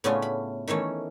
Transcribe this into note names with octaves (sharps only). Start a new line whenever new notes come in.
A2 C#3 B3 C#4 D4 F4
B5
D#3 E3 A3 C#4